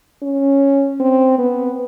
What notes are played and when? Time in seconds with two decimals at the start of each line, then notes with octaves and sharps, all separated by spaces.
0.23 C#4
1.00 C4
1.38 B3